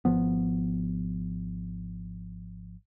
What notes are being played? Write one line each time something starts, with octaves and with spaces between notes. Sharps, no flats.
G#1 F3 B3